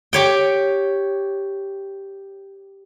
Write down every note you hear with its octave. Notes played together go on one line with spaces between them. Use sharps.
G4 C#5 G5